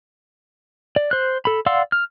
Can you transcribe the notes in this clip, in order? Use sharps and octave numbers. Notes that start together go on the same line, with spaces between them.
D5
C5 F#6
A4 B5
D5 F5 F#5 C6 E6
F6